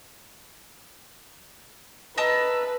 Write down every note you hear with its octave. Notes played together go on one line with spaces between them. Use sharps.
B4 D#5 A5 A#5 E6